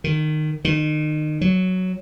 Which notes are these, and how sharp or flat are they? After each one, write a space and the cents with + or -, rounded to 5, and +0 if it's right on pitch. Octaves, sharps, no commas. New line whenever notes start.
D#3 -20
D#3 -30
F#3 +5